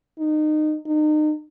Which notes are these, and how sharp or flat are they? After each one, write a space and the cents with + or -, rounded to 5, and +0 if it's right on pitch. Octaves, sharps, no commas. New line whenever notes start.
D#4 -25
D#4 -35